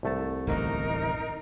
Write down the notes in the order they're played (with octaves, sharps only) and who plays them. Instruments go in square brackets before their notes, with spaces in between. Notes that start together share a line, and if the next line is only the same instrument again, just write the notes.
[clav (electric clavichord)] C2 A3 A5
[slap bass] D1 A1 D#2 [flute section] D#4 A#4